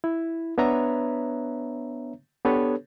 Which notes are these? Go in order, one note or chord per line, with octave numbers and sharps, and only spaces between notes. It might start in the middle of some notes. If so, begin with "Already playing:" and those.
E4
B3 D4 B4 C#5 E5 A#5
B3 D4 G4 A4 B4 C#5